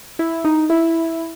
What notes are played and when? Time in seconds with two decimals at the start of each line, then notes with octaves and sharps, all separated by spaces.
0.19 E4
0.44 D#4
0.70 E4